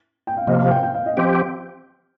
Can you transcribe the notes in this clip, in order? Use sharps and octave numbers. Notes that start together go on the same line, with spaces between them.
G5
F5
C3 F3 A#3 D#5
F5
G5
G5
F5
D#5
F3 C4 G4